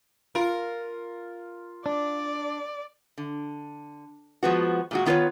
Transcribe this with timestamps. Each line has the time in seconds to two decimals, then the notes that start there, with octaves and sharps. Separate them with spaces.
0.35 F4 A#4
1.86 D4 D5
3.18 D3
4.43 F3 G#3 B3 F#4
4.91 A#2 G#3 F#4
5.06 D#3 B3 F4 A4 B4 C#5